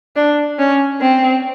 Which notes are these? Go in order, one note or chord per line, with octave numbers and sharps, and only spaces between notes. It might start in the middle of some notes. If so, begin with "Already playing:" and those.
D4
C#4
C4